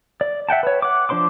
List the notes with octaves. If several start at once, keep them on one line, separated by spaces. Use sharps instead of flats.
D5
E5 F#5 G5 A5
B4 C#5
F#5 D6
F3 D4 C5 C6 D6